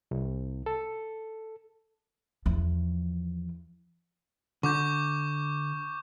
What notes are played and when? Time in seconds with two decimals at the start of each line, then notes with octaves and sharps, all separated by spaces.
0.11 C2
0.66 A4
2.46 E2 F3
4.63 D3 C#6 D6 G6